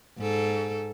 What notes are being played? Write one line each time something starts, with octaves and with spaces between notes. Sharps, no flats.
G#2 A4